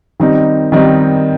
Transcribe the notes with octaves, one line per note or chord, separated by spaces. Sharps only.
D#3 G3 C4 D#4
D#3 G3 C4 D#4